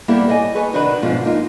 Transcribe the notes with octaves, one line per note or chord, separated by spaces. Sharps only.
G3 A#3 B3 E4 G4 A4
A4 C#5 D#5 F5 G#5
G#4 A4 B4 C#5 D#5
C3 D#3 D4 D#4 F#4 B4
G#2 B2 D3 F3 C#4 F4
A#3 D#4 F4